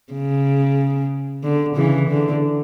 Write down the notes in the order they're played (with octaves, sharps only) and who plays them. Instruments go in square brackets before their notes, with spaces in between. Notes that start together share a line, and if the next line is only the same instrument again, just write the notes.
[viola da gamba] C#3
D3
C#3 E3
D3